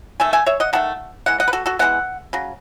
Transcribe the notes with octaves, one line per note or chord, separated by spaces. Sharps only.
D#3 A3 E5 G#5
E5 G#5
C#5 E5
D#5 F#5
D#3 A3 F#5 A5
E3 G#3 F#5
D#5 F#5
B4
F#4 A4
F#4 A4
E3 G#3 B3 F#5
C#3 F#3